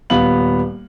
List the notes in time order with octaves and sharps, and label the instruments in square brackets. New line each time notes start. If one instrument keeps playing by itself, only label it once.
[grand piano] D#1 B3 F5 F#7